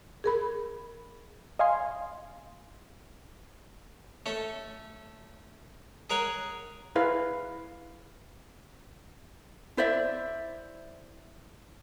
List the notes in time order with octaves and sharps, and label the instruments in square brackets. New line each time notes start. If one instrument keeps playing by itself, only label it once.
[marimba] G#4 A#4 B5
[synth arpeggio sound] D#5 F5 G#5 C6
[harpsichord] A3 C#4 A4
G#4 A#4 C#5 F#5 G#5
[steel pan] E4 G#4 B4 F5
[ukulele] E4 C5 D5 E5